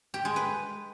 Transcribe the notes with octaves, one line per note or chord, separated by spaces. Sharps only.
G4
G#3
B4